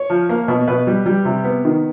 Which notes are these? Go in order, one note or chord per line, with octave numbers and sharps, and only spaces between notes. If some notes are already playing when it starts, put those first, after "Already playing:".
Already playing: C#5
F3
A#3
B2
B2 B4
G3
G3
C3
B3
D#3